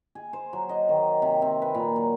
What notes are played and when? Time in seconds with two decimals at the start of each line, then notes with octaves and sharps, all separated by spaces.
0.15 G#4
0.33 C5
0.53 F#3
0.69 D#5
0.89 D#3
1.22 C3
1.42 C4
1.62 B4
1.75 A#2
1.96 F#3